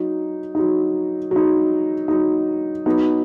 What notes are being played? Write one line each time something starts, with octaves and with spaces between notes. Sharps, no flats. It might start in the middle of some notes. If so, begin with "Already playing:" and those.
Already playing: F#3 D#4
F#3 D#4
F#3 D#4
F#3 D#4
F#3 B3 D#4